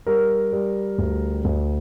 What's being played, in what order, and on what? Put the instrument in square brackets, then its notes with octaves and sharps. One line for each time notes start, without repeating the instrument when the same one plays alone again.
[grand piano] G3 A#4
G3
D2
D2